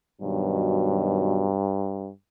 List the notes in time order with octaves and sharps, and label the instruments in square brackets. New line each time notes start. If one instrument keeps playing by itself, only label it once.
[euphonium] G2 [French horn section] B2 D#3 F#3